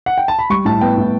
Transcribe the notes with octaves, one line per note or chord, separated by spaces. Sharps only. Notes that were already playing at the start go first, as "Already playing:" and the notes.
F#5
G5
A5
B5
G3 C#6
A2 A5
B3 G5
A2